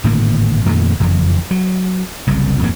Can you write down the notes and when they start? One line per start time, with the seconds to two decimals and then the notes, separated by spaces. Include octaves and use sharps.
0.04 G#1 A2 D3 A#3
0.66 F2 A#2 D#3 A3
1.00 F#1 F2 E3
1.51 F#3
2.27 F#1 C2 F#2
2.59 D#1 F2 G#2 A#3